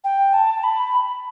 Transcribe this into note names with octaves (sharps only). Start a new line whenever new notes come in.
G5
A5
B5